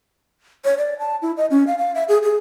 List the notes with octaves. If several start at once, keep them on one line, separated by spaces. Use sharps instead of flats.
C#5
D5
A5
E4
D#5
C#4
F5
F5
E5
G#4
G#4